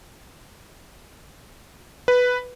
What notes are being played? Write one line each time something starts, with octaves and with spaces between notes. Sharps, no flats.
B4